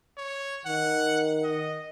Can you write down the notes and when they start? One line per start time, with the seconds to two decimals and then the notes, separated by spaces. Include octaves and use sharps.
0.17 C#5
0.65 D#3 F#5
1.44 D#5